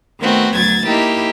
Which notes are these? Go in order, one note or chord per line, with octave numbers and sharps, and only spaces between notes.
D#3 A3 B3 C4 F#4
D2 F#3 G#6 A6
A#3 D#4 E4 G4